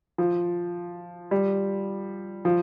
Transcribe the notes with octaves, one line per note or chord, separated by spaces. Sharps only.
F3
G3
F3